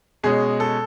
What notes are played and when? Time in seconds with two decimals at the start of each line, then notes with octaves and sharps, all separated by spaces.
0.23 B2 G#3 C#4 G#4
0.60 A4